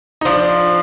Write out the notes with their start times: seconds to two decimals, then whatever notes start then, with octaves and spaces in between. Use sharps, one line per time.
0.21 D#4
0.25 F3 D4